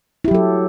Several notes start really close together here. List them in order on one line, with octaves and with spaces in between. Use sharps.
E4 G4 F#3 A4